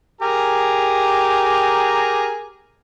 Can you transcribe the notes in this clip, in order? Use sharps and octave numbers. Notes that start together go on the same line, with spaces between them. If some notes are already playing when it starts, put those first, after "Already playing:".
G4 G#4 A#4 A#5